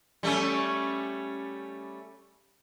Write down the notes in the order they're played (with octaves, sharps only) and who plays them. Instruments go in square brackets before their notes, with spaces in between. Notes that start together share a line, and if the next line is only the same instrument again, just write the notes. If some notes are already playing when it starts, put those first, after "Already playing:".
[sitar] G3 A3 C#4